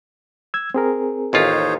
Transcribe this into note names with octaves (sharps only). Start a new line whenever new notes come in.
E6 G#6
C4 G#4 A#4
A1 D#2 D#4 F4 C5 C#5